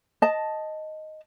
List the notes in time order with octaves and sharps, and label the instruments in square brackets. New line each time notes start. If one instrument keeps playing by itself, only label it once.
[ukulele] D#5 A5